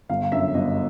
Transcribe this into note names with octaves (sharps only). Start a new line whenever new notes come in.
G1 F5
F5
F#2 D3 E5
G1 D#5